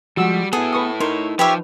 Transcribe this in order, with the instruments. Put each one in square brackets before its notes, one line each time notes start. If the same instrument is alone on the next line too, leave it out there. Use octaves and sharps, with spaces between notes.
[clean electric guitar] F3 G#3 [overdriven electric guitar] G3 [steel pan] F#4 E6
[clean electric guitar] B3 [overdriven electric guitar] E4 A4 [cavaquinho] G#4
[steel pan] B4 C#6 D#6
[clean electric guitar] D#4 [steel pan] A#4 C6 [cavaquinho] C#5
[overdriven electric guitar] F3 [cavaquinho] G4 C#5 E5 [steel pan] B4